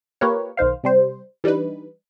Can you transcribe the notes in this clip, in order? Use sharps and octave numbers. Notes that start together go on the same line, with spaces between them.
A#3 F4 G4 A#4 B4 C#5
B1 D#3 C5 F5
C3 G3 C5
E3 G3 D4 D#4 B4